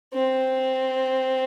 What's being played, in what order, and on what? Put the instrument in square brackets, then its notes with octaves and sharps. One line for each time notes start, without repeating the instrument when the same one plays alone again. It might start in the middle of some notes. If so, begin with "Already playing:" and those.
[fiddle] C4